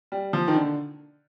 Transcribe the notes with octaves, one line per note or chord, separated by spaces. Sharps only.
G3
F3
D#3
D3